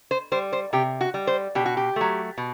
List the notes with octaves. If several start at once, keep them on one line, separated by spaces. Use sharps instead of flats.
C5
G3 C5
C5
C3 G4
F#4
G3
C5
B2 G4
F#4
G4
F#3 A3
B2